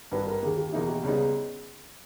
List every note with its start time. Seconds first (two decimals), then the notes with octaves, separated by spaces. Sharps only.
0.12 G#1 G2 D#3 B4
0.27 A#4
0.43 D#2 D#3 A#3 G#4
0.57 G4
0.72 E2 B2 A#3 D#4 E4 G#4
0.88 G4
1.03 C#2 C#3 G3 B3 D#4